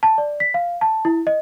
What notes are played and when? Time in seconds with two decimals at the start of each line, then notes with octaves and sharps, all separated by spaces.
0.03 A5
0.18 D5
0.40 B6
0.54 F5
0.81 A5
1.05 E4
1.27 D#5